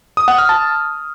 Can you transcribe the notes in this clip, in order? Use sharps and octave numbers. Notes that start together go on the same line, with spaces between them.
D#6
F#5
F6
A5